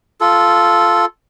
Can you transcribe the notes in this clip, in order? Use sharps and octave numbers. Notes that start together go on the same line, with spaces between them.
F4 A4